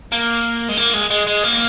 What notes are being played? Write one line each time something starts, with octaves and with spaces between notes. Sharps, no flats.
A#3
G#3
A#3
G#3
G#3
G#3
A#3